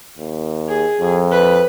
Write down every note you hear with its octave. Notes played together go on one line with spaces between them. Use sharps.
D#2
G#4
F2
B4